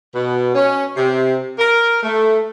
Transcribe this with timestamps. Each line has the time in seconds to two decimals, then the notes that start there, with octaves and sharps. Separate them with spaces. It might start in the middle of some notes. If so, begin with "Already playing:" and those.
0.15 B2
0.55 C#4
0.96 C3
1.59 A#4
2.03 A3